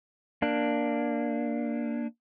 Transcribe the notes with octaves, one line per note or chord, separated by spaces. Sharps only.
A#3 D4